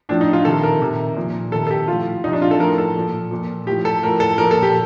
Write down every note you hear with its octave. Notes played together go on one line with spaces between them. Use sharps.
A2 F3 D4
D#4
F4
C3 D#3 A4
A#4
C3 D#3
A#2 F3
C3 D#3 A4
A4
G4
A2 F3 F4
C3 F3 D#4
D4
F4
A4
A2 F3 A#4
A4
A#2 F3
A#2 F3
A2 F3 G4
A4
A2 F3 A#4
A4
A#2 F3 A#4
A4
G4